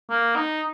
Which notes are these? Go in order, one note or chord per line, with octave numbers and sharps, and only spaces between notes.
A#3
D#4